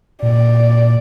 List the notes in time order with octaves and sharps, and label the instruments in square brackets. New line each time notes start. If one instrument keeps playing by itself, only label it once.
[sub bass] A#2 [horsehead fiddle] D5